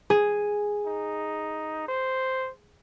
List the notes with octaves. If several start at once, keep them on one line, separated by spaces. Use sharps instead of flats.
G#4
D#4
C5